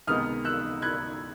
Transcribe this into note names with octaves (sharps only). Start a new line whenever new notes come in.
C#2 C3 D#3 G#3 B3 D#6 F6
E6 F#6
F#6 G#6